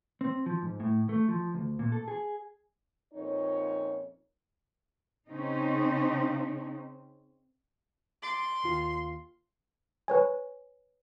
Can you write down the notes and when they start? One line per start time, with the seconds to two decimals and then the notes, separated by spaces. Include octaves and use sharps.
0.21 C4
0.46 F3
0.62 G#2
0.80 A2
1.09 A3
1.28 F3
1.54 D2
1.79 A#2
1.92 A4
2.08 G#4
3.14 F2 A#2 C#4 D#4 C#5
5.28 C#3 C4 C#4 D#4
8.22 C6 D6 A6 D7
8.64 D#2 F4
10.08 B4 C#5 G#5